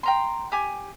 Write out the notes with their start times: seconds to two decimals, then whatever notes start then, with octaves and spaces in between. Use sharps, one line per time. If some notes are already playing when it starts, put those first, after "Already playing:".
0.03 G5 A#5 C6
0.52 G4 G#5